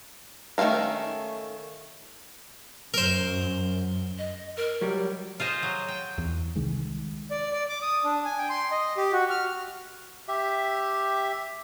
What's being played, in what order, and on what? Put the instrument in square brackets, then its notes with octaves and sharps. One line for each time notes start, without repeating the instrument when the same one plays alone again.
[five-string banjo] D#3 A3 C#4 F5 A#5
[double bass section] F#2 [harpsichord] A#4 C5
[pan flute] D#5
A#4
[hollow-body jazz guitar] F#3 G3 D5
[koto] F4 G#4 C5 D#5
F#3
G5
[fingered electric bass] E2
C2 D#3 G#3
[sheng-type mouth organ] D5
D5
D6
D#6
D4
G#5
G5
C6
D#5
G4
F#4
F6
[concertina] G4 E5